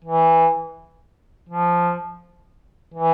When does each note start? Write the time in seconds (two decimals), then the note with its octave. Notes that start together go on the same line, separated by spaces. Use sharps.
0.05 E3
1.49 F3
2.94 E3